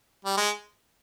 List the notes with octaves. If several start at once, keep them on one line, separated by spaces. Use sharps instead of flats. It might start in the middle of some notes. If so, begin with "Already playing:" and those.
G3
G#3